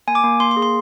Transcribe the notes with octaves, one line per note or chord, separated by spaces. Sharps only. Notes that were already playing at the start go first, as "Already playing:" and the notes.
A#3 G#5
D6
A#3
A#3 C6
C6
G#4
C6